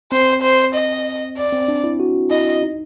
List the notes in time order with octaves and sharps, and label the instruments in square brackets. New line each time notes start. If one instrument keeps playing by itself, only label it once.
[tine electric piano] C4 [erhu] C5
[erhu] C5
D#5
D5
[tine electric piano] C4
D4
E4
F#4
[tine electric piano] E4 [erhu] D#5
[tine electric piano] D#4